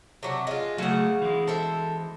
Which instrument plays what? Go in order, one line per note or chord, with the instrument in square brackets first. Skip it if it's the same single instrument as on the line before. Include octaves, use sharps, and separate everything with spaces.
[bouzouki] C3 F#3 D4
G#3 F4
[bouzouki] C#3 F#5 [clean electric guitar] F#3 A3
[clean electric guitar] E3 G#3
[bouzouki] A4 C5 E5